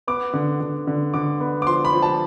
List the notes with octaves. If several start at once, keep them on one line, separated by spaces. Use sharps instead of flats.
B3 D6
D3
D3
D3
D3 D6
B3
D6
F3 C6
B5
F3
A5